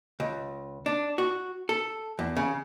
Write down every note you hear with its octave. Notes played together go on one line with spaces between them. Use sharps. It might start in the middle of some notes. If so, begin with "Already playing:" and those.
C#2
D4
F#4
A4
E2
C#3